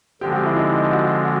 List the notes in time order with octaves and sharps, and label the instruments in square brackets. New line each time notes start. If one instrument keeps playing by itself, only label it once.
[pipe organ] D3 F3 G#3 C4 [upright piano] G4
[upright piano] F#4
E4
D#4
F#4
F#4